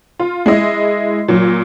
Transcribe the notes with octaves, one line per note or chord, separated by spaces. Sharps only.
F4
G#3 E4 D#5
A#2 F#3